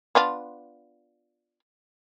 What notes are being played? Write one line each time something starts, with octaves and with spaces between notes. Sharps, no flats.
B3 D4 F4